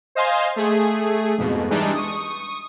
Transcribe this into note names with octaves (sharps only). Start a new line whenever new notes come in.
C5 D#5 F5 G#5 C6
A3 G#4
F2 G#2 B2
E3 G3 G#3 D4 D#4
C#6 D#6